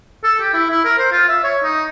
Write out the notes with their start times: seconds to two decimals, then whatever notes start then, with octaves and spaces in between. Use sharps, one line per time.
0.24 A4
0.41 G4
0.54 E4
0.70 E4
0.85 A#4
0.99 C5
1.12 F4
1.29 E5
1.44 C#5
1.64 D#4